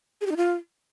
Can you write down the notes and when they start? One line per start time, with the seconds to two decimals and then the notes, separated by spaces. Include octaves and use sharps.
0.21 G#4
0.26 G4
0.31 D#4
0.37 F4